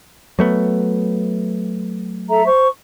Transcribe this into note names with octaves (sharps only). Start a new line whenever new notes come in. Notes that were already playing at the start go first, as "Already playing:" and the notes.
F#3 A3 B3
A4 E5 A#5
C5 C#6